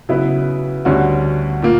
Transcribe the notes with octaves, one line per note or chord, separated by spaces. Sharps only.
C#3 F#3 B3 E4 B4
D2 D3 G3 C#4 F#4
A#2 A#3